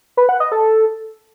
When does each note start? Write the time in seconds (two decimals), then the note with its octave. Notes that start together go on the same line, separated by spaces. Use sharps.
0.17 B4
0.29 F#5
0.40 D#5
0.52 A4